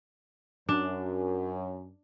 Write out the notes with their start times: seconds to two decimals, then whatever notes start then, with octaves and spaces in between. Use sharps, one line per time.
0.69 F#2 D4